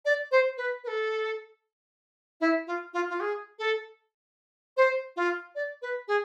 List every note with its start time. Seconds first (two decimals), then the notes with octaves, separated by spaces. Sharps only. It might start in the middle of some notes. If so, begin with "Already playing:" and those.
0.05 D5
0.31 C5
0.57 B4
0.84 B4
0.88 A4
2.41 E4
2.67 F4
2.94 F4
3.10 F4
3.20 G#4
3.59 A4
4.77 C5
5.16 F4
5.55 D5
5.82 B4
6.08 G#4